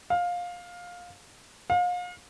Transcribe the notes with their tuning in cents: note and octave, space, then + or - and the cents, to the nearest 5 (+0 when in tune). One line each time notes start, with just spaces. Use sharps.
F5 +15
F5 +35